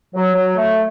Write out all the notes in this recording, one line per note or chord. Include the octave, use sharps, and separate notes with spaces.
F#3
F#3
A3